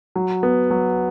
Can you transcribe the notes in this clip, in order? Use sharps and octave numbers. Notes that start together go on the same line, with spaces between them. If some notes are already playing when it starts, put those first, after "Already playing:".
F#3
B3
F#3